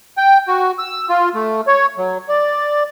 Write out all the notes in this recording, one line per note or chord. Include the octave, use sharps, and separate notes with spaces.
G5
F#4
E6
F4
A3
C#5
F#3
D5